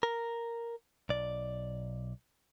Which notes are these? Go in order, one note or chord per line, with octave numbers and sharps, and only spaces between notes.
A#4
B1 D5